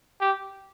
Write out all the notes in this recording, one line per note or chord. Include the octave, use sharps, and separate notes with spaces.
G4